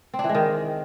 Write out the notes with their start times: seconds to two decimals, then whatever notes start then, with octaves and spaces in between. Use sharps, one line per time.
0.14 C4
0.19 D4
0.24 E3
0.29 G#3
0.35 D#3